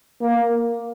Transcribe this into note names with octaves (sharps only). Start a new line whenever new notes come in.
A#3